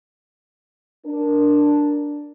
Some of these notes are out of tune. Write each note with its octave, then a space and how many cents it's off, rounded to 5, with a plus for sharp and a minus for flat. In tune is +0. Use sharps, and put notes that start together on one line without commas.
D4 +0 A#4 +0